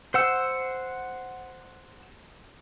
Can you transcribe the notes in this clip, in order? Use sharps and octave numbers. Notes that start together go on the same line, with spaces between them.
C5 F#5 E6